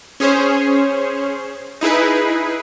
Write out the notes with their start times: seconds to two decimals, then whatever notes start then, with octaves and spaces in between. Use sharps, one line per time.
0.20 C#4 G#4 C5 C#5
1.81 D#4 E4 G#4 B4